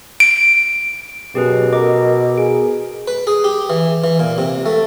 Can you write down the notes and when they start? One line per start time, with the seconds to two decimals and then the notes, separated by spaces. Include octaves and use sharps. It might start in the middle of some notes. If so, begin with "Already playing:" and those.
0.20 D7
1.35 F#2 B2 G4 G#4 B4
1.73 A4 A#4 D#5 D6
2.38 G#4 D7
3.08 B4
3.27 G#4
3.44 G4
3.70 E3
4.04 E3
4.20 A#2
4.38 C3
4.66 A3